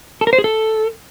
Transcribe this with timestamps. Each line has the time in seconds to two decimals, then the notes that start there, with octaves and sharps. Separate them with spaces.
0.21 A4
0.27 A#4
0.33 C5
0.38 G#4
0.44 A4